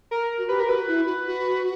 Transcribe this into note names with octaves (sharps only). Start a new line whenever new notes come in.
A#4
F#4
G4 B4
A#4
F#4 B4
E4
F#4
F#4